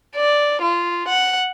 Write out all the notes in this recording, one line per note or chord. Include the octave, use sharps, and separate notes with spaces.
D5
F4
F#5